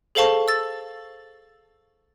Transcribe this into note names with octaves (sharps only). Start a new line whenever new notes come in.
G#4 A4 C5 F5 A5 C#6
E6 A6